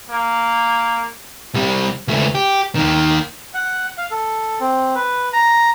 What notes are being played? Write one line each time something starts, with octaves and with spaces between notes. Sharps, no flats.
A#3
C2 G3
C#2 A3
G4
D#2 D#3
F#5
F5
A4
C4
B4
A#5